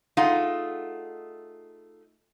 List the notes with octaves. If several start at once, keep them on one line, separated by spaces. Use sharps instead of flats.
A3 D#4 F4 G#4 F#5